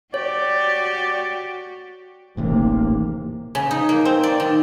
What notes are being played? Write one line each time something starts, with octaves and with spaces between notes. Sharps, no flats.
F#4 G4 C#5 D5
D#1 A1 D#2 C3 A#3
C#3
D#4
A#3
C4
D5
D#3